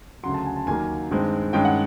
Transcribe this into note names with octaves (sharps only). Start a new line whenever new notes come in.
D2 C#3 F#3 C6
A5
G#5
A5
D#2 D#3 F#3 A#3 G#5
G2 D#3 G#3 C4
G2 D#3 G#3 C#4 G5
F#5